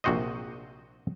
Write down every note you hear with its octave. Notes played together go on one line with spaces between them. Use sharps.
A#1 C3 F#4 C5 D#5